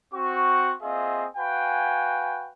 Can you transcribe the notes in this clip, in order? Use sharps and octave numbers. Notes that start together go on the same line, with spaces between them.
C4 F#4 C#6
A#3 C4 F4 G#4 D#5 E5
F#4 B4 F5 G5 G#5